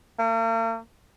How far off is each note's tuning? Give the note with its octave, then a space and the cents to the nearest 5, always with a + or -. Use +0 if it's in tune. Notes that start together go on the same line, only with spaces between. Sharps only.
A#3 -45